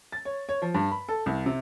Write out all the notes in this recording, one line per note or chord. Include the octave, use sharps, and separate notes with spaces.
A6
C#5
C#5
F3
G2
B5
A4
C2
C3